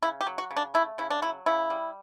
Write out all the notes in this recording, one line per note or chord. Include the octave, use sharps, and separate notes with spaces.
C#3 E4
G4
F#3
F#4
C#3
D4
A3 E4
C#3 E4
D4
F#3 E4
C#3 E4
G3